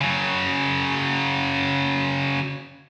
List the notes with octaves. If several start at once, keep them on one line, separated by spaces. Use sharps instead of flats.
C#3 F#3